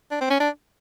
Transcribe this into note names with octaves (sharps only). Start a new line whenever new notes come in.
D4
C4
C#4
D4